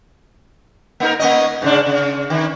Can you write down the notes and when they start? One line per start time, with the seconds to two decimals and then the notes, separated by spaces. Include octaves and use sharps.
1.00 A#3 D#4 A#4
1.20 A#3 C#4 D#5
1.62 G#2 C#3 D4
1.86 C#3
2.30 D#3